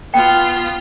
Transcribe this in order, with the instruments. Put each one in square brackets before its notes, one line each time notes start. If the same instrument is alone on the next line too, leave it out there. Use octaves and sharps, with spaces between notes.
[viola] B3 F4 [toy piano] G5